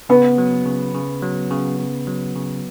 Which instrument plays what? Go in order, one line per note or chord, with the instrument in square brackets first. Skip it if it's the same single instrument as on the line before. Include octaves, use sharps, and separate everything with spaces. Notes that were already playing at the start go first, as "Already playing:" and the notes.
[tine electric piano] C#3 [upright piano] B3
[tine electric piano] F#3
C#3
C#3
F#3
C#3
C#3
F#3
C#3